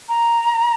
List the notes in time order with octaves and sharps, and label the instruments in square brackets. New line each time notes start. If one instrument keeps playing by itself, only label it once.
[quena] A#5